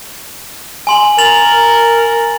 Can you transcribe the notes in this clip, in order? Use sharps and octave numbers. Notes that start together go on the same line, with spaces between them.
G#5 C6 F#7
A#4 A6 F7 F#7